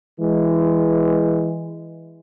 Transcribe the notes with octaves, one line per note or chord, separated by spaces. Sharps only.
E3 G#3